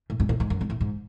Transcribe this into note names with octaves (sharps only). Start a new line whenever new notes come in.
A2
G#2
A2
G#2
F#2
G#2
A2
G#2